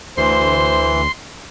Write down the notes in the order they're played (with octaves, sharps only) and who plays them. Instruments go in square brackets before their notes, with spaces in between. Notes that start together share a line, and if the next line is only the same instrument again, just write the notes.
[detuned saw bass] D2 [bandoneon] E3 [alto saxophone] C5 [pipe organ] C6